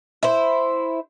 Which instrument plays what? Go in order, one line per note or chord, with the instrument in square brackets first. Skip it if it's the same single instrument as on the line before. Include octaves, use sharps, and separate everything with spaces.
[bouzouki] E4 C5